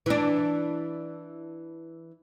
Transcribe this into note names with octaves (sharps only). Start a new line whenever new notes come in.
E3 D4